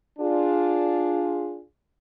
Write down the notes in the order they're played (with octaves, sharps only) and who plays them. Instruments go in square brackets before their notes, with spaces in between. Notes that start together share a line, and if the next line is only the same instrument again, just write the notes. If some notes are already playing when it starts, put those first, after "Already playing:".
[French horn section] D4 F4 G#4